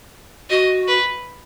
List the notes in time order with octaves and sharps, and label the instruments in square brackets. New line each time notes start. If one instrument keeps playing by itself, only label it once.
[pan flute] F#4 [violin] D#5
[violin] B4